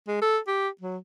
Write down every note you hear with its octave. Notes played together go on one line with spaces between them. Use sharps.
G#3
A4
G4
F#3